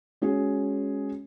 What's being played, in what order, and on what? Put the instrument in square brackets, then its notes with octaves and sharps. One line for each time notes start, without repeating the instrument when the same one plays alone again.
[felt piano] G#3 C#4 F#4 G#4 C#5